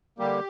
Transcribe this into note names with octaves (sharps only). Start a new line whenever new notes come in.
D3 G3 A#3 G4